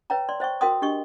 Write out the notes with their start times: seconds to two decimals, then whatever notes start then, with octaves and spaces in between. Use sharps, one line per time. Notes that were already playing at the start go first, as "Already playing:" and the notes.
0.10 B4 C#5 E5 G5 A#5
0.29 D5 C6
0.40 C5 E5 G5 C#6
0.61 F#4 A#4 E5 G5 C6 D#6
0.82 D4 G4 D#5 C#6